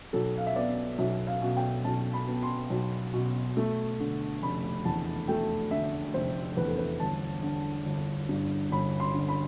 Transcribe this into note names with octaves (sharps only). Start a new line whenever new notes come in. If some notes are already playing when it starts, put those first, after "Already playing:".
B1 A4
F5
E5
B3 D5
B1 E5
F5
B2
G5
B1 A5
B5
B3
C6
B1
B2
A3
D3
F1 B5
E2 A5
A3 G5
D3 E5
F1 C5
E2 B4
A4
B4
G1 A5
D3
G1
G2
G1 B5
C6
D3
B5